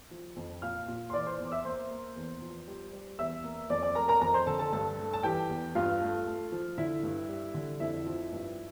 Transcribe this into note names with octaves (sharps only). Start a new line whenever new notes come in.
F3
F2
A#2 F5 F6
A#2
C6
E3 D5 D6
C5 C6
E2
D6
E5 E6
A#3 C5 C6
A#3
E2
F3
G3
G3
E2 E5 E6
A#3
F2 D5 D6
D5 D6
A3 A#4 A#5
A#4 A#5
F2 A#4 A#5
C5 C6
D3 A4 A5
A4 A5
G2 A4 A5
A3
A5
E3 G4 G5
E2
G2 F4 F5
A3
A3
F3
D3 E4 E5
G2
G3
D3
F2 E4 E5
F3
G2